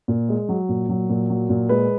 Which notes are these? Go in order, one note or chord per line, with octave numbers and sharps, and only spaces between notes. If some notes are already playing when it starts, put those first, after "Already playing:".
A#2
G#3
F#3
A#2
F#3
A#2
F#3
A#2
G#3 B4